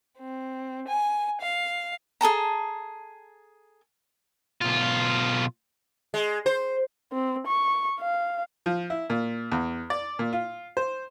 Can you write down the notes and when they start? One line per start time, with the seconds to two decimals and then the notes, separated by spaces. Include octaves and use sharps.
0.20 C4
0.88 G#5
1.41 F5
2.21 G#4 A4 A5 A#5
4.61 B1 F4
6.14 G#3
6.46 C5
7.13 C4
7.47 C#6
8.00 F5
8.66 F3
8.90 E4
9.10 A#2
9.52 E2
9.90 D5
10.19 A#2
10.33 F4
10.77 C5